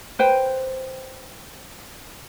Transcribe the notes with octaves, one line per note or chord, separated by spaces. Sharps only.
B4 C5 G5